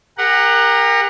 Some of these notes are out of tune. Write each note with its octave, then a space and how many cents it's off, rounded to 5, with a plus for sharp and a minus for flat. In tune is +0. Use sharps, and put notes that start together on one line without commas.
G4 +40 A#4 +0 F#5 +0